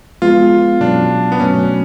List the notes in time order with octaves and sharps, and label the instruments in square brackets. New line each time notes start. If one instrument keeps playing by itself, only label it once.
[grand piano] F3 G#3 B3 [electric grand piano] F4
[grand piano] B2 F#3 C#4 [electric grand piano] D4
[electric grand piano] B3
[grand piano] B2 F#3 A3 [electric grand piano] C#4